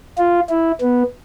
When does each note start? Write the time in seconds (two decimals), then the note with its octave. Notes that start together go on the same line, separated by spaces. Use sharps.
0.18 F4
0.50 E4
0.81 B3